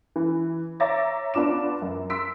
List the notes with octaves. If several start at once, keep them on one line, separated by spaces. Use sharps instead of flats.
E3
C#5 E5 A#5 D6 A6 A#6
B3 D4 F4 D6 E7
F#2
C6 E6 B6 D7